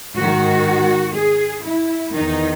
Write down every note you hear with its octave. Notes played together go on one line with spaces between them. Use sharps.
G#2 D#3 F#4
G#4
E4
E2 D#3 D#4